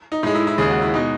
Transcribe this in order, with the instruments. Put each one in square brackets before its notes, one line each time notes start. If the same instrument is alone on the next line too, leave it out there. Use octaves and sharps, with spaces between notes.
[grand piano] D#4
A2 G#3 D#4
E4
E4
D#2 C#3 G#3 G#4
F#4
E4
B2 G#3 D#4